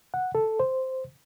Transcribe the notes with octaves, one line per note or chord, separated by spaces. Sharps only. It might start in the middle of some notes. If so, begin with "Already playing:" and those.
F#5
A4
C5